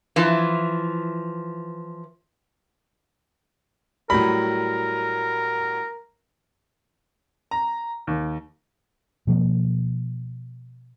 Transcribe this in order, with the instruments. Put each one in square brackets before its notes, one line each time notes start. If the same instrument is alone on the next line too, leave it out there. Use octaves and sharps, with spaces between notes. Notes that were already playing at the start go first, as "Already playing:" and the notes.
[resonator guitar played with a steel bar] E3 F3
[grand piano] A2 F#3 G3 [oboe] A#4 [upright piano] B5
[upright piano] A#5
D#2
[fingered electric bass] B2 F3 G3 A#3